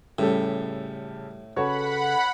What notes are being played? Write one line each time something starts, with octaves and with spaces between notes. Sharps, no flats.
A2 C#3 G3 G4 A4
C#3 F#4 A4 B4 C#5 F#5 A5 B5